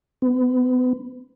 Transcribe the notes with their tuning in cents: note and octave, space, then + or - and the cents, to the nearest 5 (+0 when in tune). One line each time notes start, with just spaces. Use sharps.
B3 +35